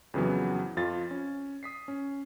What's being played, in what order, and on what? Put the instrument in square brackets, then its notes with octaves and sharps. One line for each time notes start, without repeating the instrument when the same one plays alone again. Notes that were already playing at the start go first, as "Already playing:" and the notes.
[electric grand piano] F2 C#3 E3 F#3 B3
F2 F4 A6
C#4
D#6 B6 C7
C#4